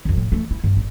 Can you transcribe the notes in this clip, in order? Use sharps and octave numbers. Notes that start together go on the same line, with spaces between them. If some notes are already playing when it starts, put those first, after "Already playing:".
B1 F2
A2
E3 A3
E4
C2 G2
G#1